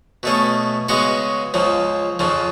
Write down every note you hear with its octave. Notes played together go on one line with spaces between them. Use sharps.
B2 A3 C#4 G#4
C#3 G#3 B3 F#4 C#5
C#2 C#3 F3
F2 C#3 F3